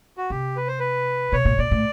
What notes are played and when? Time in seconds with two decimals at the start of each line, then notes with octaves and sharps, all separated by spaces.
0.17 F#4
0.30 C3 G4
0.56 B4
0.68 C5
0.80 B4
1.32 B2 C#5
1.45 A#2
1.58 A#2 D5
1.71 A2